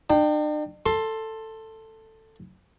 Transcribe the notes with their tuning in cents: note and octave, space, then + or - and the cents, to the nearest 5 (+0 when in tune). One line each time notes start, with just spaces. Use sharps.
D4 +45 G5 +0
A4 +10 C6 +15